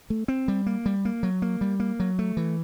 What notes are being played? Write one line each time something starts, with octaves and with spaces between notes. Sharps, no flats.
A3
C4
G3
A#3
G3
A#3
F#3
A#3
G3
A#3
F#3
A3
E3